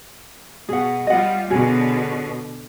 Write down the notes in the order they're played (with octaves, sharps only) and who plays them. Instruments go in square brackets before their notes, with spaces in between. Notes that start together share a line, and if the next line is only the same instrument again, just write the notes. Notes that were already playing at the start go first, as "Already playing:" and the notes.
[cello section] B2 [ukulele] G#4 F#5
[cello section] G3 F4 [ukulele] D#5 F#5
[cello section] B2 D3 [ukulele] C#4 F#4 G#4